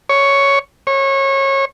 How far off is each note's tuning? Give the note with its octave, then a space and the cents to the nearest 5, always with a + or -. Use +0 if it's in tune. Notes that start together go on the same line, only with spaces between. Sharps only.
C#5 +5
C#5 -25